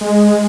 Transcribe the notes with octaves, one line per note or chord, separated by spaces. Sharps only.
G#3